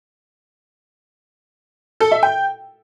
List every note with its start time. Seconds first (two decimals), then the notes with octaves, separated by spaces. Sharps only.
2.00 A4
2.12 E5
2.23 G5